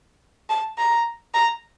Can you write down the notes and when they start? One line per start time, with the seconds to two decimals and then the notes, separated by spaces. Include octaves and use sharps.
0.50 A5
0.78 A#5
1.34 A#5